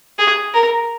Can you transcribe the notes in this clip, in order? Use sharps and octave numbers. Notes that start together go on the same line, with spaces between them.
G#4
A#4